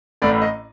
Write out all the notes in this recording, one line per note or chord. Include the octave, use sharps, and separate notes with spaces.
A1 A2 A3 D5
D#5